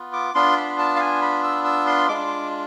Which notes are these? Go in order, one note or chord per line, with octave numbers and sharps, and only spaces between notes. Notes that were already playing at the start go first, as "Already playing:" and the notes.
Already playing: B3 F4
D6
B3 D4 F4 C6
B5
A5
F5
G#5
B5
E6
E6
C6
G#3 D4 F4 D6